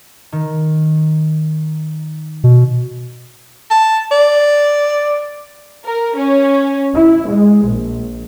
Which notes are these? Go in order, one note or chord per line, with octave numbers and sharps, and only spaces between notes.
D#3
B2
A5
D5
A#4
C#4
E4
G#3
A#1